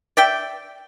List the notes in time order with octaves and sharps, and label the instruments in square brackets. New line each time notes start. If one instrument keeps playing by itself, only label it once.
[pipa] D5 E5 G5